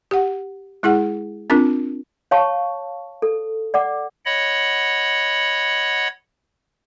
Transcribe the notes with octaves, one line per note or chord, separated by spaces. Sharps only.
G4 F#5
G#3 E4 G#4 F#5
C4 D4 F4 A#4
C#5 F5 A5 C#6
A4
D5 F#5 D6
C#5 D#5 F#5 B5